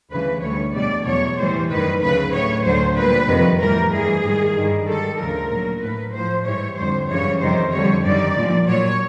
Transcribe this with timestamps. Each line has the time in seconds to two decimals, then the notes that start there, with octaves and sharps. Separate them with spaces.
0.11 D2 C#3 E3 G3 B4
0.42 D2 D3 G3 C#5
0.74 E2 B2 G3 D5
1.06 E2 B2 F#3 C#5
1.38 A2 E3 G3 C5
1.69 F#2 D#3 G3 B4
2.01 D2 C#3 F#3 B4
2.33 A2 F#3 C#5
2.64 D2 D3 F#3 C5
2.96 A#2 G3 B4
3.28 F2 C3 D#3
3.60 A2 E3 G3 A#4
3.92 G2 E3 G3 G#4
4.23 G#2 D#3 G3
4.55 G2 D#3 G3
4.88 G#2 D#3 G3 A4
5.19 D2 C#3 F3 A#4
5.51 A#2 F#3
5.82 A2 F#3 B4
6.14 A2 F3 C5
6.46 G#2 E3 G3 C#5
6.77 F2 D3 G3 C5
7.09 F#2 C#3 E3 G3 C#5
7.41 F2 C3 D#3 G3 C5
7.73 F2 D3 G3 C#5
8.05 F#2 D#3 G3 D5
8.37 A#2 F3
8.68 A#2 F#3 C#5